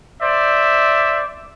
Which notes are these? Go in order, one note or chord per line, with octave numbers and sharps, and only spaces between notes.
C5 D5 E5